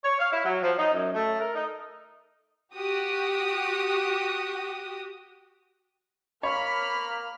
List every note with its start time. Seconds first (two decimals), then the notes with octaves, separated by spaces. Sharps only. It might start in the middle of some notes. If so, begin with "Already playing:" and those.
0.05 C#5
0.20 F5
0.32 E4
0.45 F#3
0.63 F3
0.78 D#4
0.93 F#2
1.15 A3
1.40 A#4
1.56 D#4
2.72 F#4 G4 D#6
6.43 A#3 C#5 B5 F6